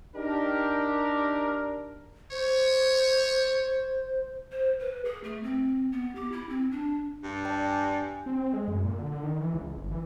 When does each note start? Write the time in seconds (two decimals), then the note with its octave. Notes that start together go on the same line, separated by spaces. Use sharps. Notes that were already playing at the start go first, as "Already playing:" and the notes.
0.15 D4 D#4 G4 A#4
2.31 C5 C#5
4.52 C5
4.80 B4
5.05 G#4
5.24 A3
5.43 C4
5.92 B3
6.15 G4
6.32 E4
6.49 C4
6.71 D4
7.23 G2
7.45 D5 G5 A5
7.71 G#5
8.26 C4
8.53 G#3
8.68 F#2
8.85 A#2
8.99 D3
9.11 D3
9.23 D#3
9.40 E3
9.53 C#2
9.76 G1
9.91 E3